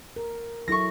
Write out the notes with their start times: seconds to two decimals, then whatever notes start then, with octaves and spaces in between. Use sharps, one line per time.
0.16 A#4
0.68 F#3 E4 A4 C#6 A#6